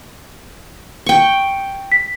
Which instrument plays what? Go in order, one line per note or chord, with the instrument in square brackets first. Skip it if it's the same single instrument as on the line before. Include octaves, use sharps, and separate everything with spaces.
[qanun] G5 C#6
[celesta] B6